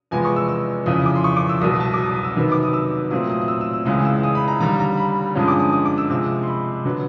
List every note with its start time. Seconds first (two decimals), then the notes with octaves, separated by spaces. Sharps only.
0.11 E2 C3 F3 G#3 B3 G#5
0.25 C#6
0.36 E6
0.49 E6
0.86 F2 C#3 E3 D#6
1.06 D6
1.15 C6
1.24 C#6
1.36 D6
1.49 E6
1.61 C2 B2 F#3 D#6
1.80 A5
1.94 D6
1.98 D#6
2.13 D#6
2.24 E6
2.36 C3 D#3 F#3 B3
2.52 D6
2.62 D#6
2.73 E6
3.11 A#2 F#3 A3 C4 D#6
3.29 D#6
3.42 D#6
3.48 E6
3.61 E6
3.73 E6
3.85 C#2 C#3 E3 G#3 D#6
4.05 E6
4.23 D#6
4.35 B5
4.48 A#5
4.60 D#2 D3 G3 A#5
4.80 A#5
4.97 B5
5.35 G2 D3 F3 G#3 C#4 D#6
5.48 D6
5.60 D#6
5.73 D#6
5.85 D6
5.98 E6
6.10 C3 F3 G#3 E6
6.43 C6
6.47 B5
6.85 D3 F#3 B3